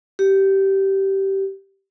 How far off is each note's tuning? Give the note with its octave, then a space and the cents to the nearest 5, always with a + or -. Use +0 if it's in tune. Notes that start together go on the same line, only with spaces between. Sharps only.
G4 -15